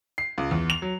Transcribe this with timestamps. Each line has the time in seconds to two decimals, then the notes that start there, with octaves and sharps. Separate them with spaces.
0.18 C7
0.38 C#2
0.51 E2
0.70 F7
0.82 F#3